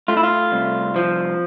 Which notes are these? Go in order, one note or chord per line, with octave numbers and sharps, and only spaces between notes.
A3 F4
E4
F4
C2
F3